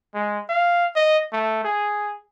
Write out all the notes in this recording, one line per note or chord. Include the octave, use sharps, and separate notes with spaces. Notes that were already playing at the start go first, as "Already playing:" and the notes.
G#3
F5
D#5
A3
G#4